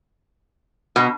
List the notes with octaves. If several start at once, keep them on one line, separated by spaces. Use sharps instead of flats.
B2